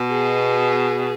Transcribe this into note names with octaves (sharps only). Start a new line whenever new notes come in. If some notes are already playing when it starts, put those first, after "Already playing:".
Already playing: B2
G#4